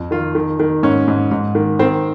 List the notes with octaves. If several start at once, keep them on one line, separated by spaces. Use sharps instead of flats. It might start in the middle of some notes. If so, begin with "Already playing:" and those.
Already playing: F2
D#3 F4
D#3
D#3
G#2 C#4
G#2
G#2
D#3
D#3 C4